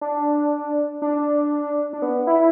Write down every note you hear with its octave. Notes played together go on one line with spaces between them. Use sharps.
D4
D4
D4
B3
E4